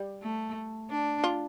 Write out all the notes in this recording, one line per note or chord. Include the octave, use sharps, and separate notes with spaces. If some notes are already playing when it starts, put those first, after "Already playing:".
Already playing: G3
A3
D4
F4